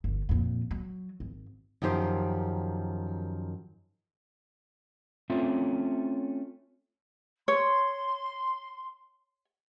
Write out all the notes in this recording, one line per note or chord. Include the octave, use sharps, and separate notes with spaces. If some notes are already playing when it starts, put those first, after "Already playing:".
G1
F2 A#2
F#3
G#1
F#2 D#3 F3 G4 C5
A3 C4 C#4 F4 E5
C#5 C6